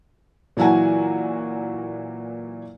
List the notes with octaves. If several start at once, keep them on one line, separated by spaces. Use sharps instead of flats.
A#2 E3 F#3 E4 F#4 G#5